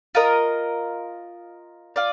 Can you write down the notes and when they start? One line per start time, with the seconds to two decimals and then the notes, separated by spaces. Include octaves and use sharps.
0.15 F4 A#4 D#5
1.96 F4 D5